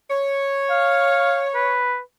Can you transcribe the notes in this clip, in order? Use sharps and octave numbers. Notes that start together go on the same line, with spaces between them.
C#5
F5
B4